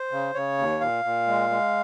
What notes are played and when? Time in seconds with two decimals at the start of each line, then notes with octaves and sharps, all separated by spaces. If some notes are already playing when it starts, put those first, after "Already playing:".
Already playing: C5
0.11 C#3
0.34 C#3 C#5
0.58 D#2
0.81 A#2 F5
1.05 A#2
1.28 G#3
1.50 G#3